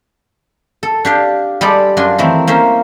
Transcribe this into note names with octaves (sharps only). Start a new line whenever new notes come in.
A4
D4 G4 F5
G3 G#3 G4 A4 D5
F#2 D4 F4 G#5 C6
D#3 E3 A3 C4
A#3 C#4 C5 E5